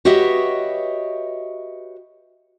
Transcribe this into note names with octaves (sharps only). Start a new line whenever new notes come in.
F#4 G4 B4 C#5 D#5 E5